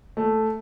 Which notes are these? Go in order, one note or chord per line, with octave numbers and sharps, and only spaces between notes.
A3